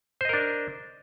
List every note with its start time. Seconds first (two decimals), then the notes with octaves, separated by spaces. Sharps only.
0.21 C5
0.25 D#5
0.29 A#4
0.33 D4